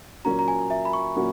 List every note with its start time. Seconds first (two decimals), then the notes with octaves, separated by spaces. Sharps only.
0.25 A#2 F#3 A#3 C#4 F#4 A#5
0.39 A#5
0.48 G#5
0.70 E5
0.85 B5
0.93 C#6
1.16 A#2 F#3 A#3 C#4 F#4